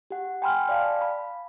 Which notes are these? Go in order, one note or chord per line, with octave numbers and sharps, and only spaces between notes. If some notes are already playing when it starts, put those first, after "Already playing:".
G4 F#5
G5 G#5 B5 C6 F6
D5 F5 A5
B5